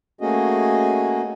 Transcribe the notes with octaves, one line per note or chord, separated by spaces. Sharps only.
A3 A#3 C#4 F#4 G#4 D#5